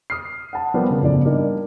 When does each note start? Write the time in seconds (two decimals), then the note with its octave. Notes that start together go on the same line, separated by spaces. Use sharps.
0.10 D#6 F6 C7
0.53 F#5 A5
0.74 F3 G3 A#3 B3
0.91 C#3
1.02 G1 A2 C#3 F3 D5
1.25 E3 G3 A#3 D4 D#4 G4